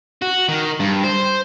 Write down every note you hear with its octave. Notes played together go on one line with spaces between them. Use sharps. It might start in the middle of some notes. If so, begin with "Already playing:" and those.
F#4
D#3
G2
C5